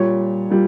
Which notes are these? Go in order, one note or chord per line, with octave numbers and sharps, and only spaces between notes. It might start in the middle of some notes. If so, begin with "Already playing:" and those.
Already playing: A#2 G3 C#5
A#2 G3